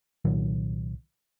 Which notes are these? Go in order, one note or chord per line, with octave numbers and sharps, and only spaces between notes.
C2 A#2 D#3 F#3